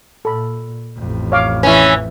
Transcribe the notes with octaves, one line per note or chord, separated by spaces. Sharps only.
A#2 A4 B5
A1 F2
C#5 F5 D6
E3 C#4 B4 E5